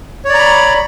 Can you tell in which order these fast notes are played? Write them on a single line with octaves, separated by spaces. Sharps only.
C#5 D5 A#5 B5